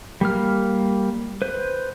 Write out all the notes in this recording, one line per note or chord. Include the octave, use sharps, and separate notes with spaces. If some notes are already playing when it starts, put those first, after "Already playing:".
G3 A#3 F6
B4 C5